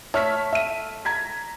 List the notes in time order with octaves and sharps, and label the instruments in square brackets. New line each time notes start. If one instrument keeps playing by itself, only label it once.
[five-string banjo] A3 [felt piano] C#5 F6 B6
[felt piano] E5 D#7
A#5 G#6 B6